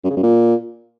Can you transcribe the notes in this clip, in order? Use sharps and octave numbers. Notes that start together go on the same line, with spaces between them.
F#2
C#3
F#2
A#2